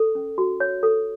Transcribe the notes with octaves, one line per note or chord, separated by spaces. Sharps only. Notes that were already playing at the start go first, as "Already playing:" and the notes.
Already playing: A4
C#4
F#4
C#5
A4